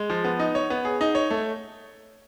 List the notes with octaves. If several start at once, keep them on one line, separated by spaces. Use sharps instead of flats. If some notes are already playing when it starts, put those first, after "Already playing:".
Already playing: G#3
F3
B3
D#4
C#5
B3
G#4
D#4
C#5
A3